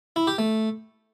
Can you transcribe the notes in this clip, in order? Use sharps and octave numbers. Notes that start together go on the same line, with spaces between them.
E4
G4
A3